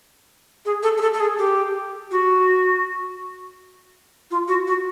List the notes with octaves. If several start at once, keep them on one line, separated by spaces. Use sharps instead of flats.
G#4
A4
G#4
A4
A4
G#4
G4
F#4
F4
F#4
F#4